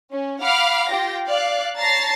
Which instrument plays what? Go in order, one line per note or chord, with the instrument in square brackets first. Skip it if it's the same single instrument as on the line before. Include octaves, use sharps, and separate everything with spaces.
[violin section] C#4
F5 F#5 B5 D6 F6
F4 G4 G5 A#6
D5 F5 F#6
C#5 A5 A#5 A6 A#6 C7